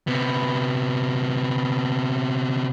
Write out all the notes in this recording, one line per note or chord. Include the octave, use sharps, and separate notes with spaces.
C3 B3